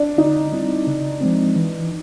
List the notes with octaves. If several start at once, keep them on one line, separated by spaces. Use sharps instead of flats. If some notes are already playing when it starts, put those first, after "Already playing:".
Already playing: D4
D3 D#4
G3 C4 E4
C#3
F3 G#3 C4
E3